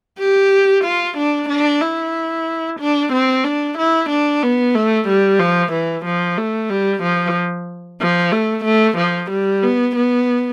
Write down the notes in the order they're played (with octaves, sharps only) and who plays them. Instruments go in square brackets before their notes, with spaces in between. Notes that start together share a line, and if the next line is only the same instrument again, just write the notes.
[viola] G4
F4
D4
D4
E4
D4
C4
D4
E4
D4
B3
A3
G3
F3
E3
F3
A3
G3
F3
F3
A3
A3
F3
G3
B3
B3